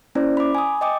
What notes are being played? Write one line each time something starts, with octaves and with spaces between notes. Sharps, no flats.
A#3 C#4 E4 C5 D5
B5 D6
G#5 D#6
D#5 G5 D6 D#6